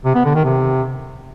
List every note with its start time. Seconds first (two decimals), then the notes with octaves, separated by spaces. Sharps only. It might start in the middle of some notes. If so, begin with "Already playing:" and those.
0.05 C3
0.15 B3
0.25 D3
0.35 D#3
0.45 C3